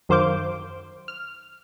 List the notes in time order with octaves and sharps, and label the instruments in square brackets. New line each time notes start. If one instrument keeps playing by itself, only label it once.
[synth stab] F#2 D#3 C5 F5 D6 G6
F6